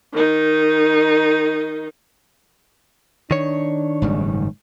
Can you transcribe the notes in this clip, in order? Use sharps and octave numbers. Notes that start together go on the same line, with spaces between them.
D#3 D#4
D#3 D4 C#5
F#1 G#2 G3